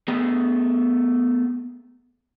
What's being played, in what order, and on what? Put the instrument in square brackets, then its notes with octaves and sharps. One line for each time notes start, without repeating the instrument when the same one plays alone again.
[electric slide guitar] A3 B3 G#4 G5